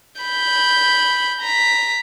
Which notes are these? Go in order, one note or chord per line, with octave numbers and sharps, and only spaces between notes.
B5 G6
A#5 B6